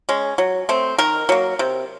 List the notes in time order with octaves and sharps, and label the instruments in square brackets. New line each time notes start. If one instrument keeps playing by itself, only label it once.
[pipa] G#3 C#4
F#3
A3 C4
D#3 A#4
F#3 A#3
C3